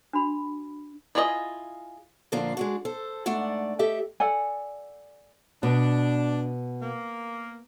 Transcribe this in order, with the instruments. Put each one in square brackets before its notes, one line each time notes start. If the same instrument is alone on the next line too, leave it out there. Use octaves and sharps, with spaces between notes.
[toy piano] D4 F#4 B5
[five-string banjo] E4 F4 G#4 D5 D#5
[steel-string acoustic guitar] A#2 D3 F3 A#3 D4
G#3 D4 F#4
A4 C5
G#2 A3 D4 D5 F#5
G4 A4 D#5 E5
[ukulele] A4 D5 F#5 G#5
[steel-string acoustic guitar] B2 [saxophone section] D4
[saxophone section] A#3